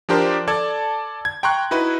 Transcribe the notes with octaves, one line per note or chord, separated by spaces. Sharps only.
F3 D4 G4 A#4 C5 D5
A4 D5 A5 G#6
G#6
G5 A#5 C6 C#6 F#6
D#4 E4 F#4 B4